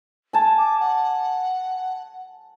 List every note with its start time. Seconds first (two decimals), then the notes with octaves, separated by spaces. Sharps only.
0.33 G#5 A5
0.58 D6
0.80 F#5